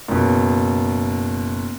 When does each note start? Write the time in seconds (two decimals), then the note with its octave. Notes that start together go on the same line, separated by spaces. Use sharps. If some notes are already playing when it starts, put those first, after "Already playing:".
0.08 F#1 B2